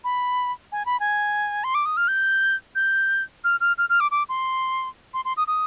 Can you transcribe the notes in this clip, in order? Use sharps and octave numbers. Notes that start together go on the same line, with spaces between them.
B5
G#5
B5
G#5
C6
D6
D#6
F6
G6
G6
F6
F6
F6
F6
D6
D6
C6
C6
C6
D#6
D#6